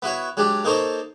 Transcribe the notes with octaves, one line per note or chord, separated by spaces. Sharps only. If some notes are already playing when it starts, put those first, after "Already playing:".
B3 E4 F#4 C#5
F#3 G#3 D4 G4
A#3 D#4 A4 C5 C#5 D#5